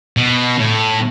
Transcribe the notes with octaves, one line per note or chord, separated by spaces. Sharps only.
B2
A2